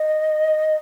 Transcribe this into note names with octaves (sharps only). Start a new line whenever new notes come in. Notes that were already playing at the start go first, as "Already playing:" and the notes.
Already playing: D#5